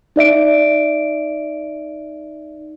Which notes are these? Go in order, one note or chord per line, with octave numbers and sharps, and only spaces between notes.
D#4 D5 E5 D7